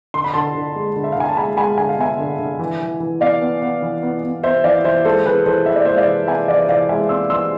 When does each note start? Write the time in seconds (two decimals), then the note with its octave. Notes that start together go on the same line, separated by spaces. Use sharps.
0.14 D3 C6
0.24 B5
0.34 D3 A5 C6
0.55 D3
0.76 G#3
0.96 D3
1.04 E5
1.12 F5
1.16 D3 G#5
1.29 A5
1.37 G#3 G#5 B5
1.57 G#3 G#5 B5
1.78 D3 G#5
1.89 F5
1.98 B3 E5 G#5
2.19 D3
2.39 D3
2.59 E3
2.80 E3
3.00 E3
3.21 B3 D5 F5
3.41 B3
3.62 B3
3.82 E3
4.03 B3
4.23 B3
4.43 B3 C5 E5
4.64 E3 D5 F5
4.84 E3 C5 E5
5.05 G#3 A4 C5
5.26 E3 G#4 B4
5.46 E3 A4 C5
5.66 E3 E5
5.75 D5
5.85 G#3 C5 E5
5.97 D5 F5
6.07 E3
6.27 C4 E5 G#5
6.48 E3 D5 F5
6.69 E3 D5 F5
6.89 G#3 E5 G#5
7.09 C4 C6 E6
7.30 E3 C6 E6